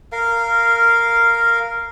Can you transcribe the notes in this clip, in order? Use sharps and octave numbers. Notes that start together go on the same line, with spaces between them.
A#4 F5